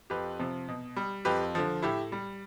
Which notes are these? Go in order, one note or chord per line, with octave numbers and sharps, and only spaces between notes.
F2 G4 B4
C3 F3
B2
G3
F2 G4 B4
D3 F3
A2 E4 G4
G3